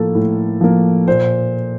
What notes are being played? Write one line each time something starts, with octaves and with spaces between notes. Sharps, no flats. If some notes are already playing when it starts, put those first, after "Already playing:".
Already playing: A2 F3 A#3 A4
A2
F3 A#3
A#2 C5